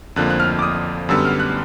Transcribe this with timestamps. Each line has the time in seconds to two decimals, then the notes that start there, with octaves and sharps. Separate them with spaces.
0.16 F2 D3 F3 A#3 F#6
0.30 F#6
0.40 F6
0.59 D6
0.62 D#6
1.09 F#2 D3 G3 B3 E6
1.25 F6
1.40 F#6